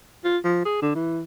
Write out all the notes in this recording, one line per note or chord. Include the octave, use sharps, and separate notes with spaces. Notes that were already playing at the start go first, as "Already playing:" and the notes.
F4
F3
G#4
D3
E3